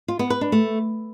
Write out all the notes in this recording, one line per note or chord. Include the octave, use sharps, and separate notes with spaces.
F4
B3
B4
D4
A3